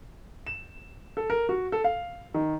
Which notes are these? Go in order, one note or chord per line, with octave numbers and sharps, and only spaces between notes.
E7
A4
A#4
F#4
A4
F5
D#3